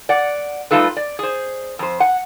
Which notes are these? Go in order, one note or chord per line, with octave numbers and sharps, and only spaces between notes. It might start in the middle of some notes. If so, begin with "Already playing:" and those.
D5 F#5
G3 A3 D#4 F4 A4 B4
D5
G#4 C5
F2 C5
F#5